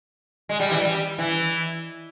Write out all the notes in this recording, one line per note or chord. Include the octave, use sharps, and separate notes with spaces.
G#3
G3
E3
G3
E3